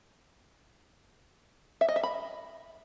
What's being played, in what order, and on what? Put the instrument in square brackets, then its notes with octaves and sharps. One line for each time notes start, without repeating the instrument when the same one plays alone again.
[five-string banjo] E5
D#5
E5
B5